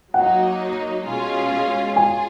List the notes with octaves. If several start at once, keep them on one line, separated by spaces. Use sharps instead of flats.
F#3 A#3 D#4 F#5
B2 G#3 C#4 F4 G#4
F4 G#4 G#5